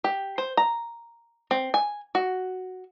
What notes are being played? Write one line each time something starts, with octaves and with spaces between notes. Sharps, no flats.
G4
C5
A#5
C4
G#5
F#4